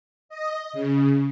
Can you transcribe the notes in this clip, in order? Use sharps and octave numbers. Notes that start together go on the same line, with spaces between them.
D#5
C#3